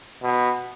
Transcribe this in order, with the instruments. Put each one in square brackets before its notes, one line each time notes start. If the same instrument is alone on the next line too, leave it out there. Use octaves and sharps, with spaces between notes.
[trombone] B2